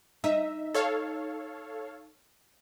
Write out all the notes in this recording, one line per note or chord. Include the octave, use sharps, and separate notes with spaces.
D#4 E5
A4 C#5 F5